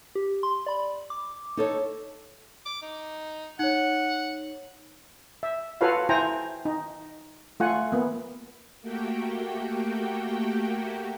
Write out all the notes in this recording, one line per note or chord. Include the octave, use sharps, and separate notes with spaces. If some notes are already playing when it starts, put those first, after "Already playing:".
G4
C6
D5 B5
D6
D#4 A4 C#5
D6
D#4
D#4 C#5 F#5
E5
F4 F#4 A4 B4 C#5 F5
E4 C5 G5 G#5 A#5
D#4
A3 F4 F#5 G#5
A#3 B3
A3 A#3 F#4 G4 G5